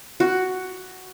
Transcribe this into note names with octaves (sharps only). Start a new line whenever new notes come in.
F#4